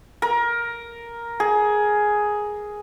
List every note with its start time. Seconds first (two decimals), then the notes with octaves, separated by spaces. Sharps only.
0.22 A#4
1.40 G#4